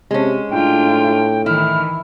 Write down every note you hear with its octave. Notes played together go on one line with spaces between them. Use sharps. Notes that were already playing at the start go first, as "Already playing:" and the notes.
C3 G#3 C#4
A2 D4 F4 G5
D#3 E3 E4 F6